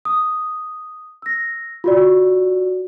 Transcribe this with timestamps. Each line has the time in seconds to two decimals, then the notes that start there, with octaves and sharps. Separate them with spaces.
0.05 D#6
1.22 E6 A#6
1.84 F4 F#4 D5